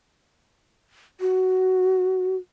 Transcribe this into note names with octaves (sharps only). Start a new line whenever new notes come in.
F#4